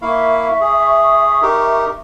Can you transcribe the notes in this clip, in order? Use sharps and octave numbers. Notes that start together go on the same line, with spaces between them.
A#3 E4 E5 F5 C#6
G#4
D#4 G4 A#4